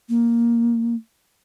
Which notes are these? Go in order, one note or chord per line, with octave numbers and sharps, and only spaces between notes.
A#3